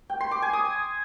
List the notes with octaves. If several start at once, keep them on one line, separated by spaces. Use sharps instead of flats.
G5
C6
D6
G#5
D#6